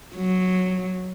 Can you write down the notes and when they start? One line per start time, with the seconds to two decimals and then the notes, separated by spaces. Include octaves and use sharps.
0.16 F#3